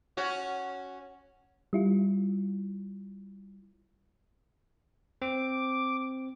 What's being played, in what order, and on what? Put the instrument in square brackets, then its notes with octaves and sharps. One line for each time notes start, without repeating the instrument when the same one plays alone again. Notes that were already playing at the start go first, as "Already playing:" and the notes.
[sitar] C#4 F#4
[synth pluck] G3 E4 F4
[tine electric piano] C4 [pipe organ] D6